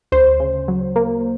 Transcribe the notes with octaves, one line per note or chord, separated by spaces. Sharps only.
D2 C5
C#3
F#3
A#3